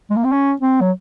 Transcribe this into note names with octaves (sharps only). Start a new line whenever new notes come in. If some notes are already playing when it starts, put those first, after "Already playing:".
G#3
A#3
C4
C#4
C4
F#3